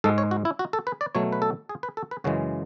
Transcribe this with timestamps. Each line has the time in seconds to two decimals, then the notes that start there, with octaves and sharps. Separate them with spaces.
0.04 G#2 G#3 A4
0.18 C#5
0.31 F#4
0.45 E4
0.59 F#4
0.73 A4
0.87 B4
1.01 D5
1.15 B2 F#3 A3 C#5
1.32 B4
1.42 A4
1.69 G#4
1.83 B4
1.97 A4
2.11 B4
2.24 F#2 C#3 E3 G#3 F#4